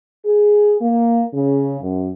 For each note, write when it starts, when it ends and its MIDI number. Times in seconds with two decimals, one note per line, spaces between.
0.24 0.75 68
0.81 1.22 58
1.33 1.80 49
1.81 2.08 42